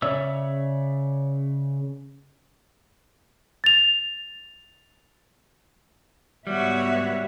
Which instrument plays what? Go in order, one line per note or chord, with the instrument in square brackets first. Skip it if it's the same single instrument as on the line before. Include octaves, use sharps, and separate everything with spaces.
[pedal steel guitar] C#3 C#5 D5 E5 E6
[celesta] A6 F7
[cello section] G#2 B3 E5 [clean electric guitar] G3 [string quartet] F#4 C#5